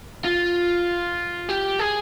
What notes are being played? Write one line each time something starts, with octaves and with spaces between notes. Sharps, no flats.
F4
G4
G#4